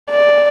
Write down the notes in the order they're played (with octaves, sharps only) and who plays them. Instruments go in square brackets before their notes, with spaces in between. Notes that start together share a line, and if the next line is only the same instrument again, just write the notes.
[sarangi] D5